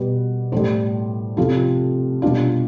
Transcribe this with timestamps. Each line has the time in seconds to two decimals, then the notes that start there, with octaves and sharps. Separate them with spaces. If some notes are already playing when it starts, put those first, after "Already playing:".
Already playing: B2 G3 G4 B4
0.52 A2 G3 A4 C5
1.37 C3 F3 F4 A4
2.22 B2 G3 D4 F4